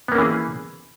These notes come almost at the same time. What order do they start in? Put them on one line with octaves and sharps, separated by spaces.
B3 A#3 C#4 E3 G#4